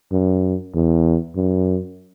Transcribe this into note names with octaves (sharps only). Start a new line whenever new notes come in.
F#2
E2
F#2